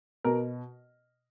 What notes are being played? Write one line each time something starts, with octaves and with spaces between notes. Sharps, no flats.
B2 A#4